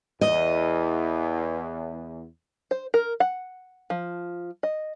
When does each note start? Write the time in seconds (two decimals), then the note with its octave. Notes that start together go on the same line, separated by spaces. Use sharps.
0.21 E2 D#5
2.71 C5
2.94 A#4
3.20 F#5
3.90 F3
4.63 D#5